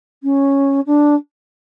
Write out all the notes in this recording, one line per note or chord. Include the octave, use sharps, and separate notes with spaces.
C#4
D4